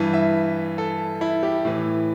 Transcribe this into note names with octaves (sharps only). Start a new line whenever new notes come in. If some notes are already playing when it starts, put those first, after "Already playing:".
Already playing: G2 E3
E5
A4
E4
G4
A2 E3